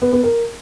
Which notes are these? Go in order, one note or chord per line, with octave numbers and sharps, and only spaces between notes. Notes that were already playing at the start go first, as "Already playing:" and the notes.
B3
B3
A#4